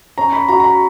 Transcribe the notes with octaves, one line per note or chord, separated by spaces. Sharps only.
C#4 A#5
B5
F#4 A#5
A#5
B5